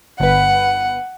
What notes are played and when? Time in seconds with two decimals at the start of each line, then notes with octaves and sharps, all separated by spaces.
0.20 G1 B4 F#5